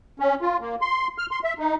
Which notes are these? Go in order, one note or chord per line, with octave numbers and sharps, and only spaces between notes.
C#4
F4
A#3
C6
F6
C6
E5
D#4